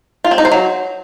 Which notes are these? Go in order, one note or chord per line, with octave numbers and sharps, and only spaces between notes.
F4
C4
D#4
C5
F#3